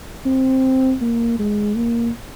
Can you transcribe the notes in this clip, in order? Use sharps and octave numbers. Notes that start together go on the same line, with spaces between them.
C4
A#3
G#3
A#3